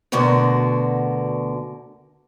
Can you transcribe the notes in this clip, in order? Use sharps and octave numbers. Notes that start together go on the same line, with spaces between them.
D2 B2 D3 F#4 A#4